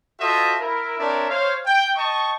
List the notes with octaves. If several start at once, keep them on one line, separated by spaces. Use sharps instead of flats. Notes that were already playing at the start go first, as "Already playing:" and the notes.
F4 F#4 A4 C5 D#5 E5
E4 A#4
C4 D4 A#4 C#5 D5 E5
C5 C#5 F5
G5
D#5 G5 A5 C#6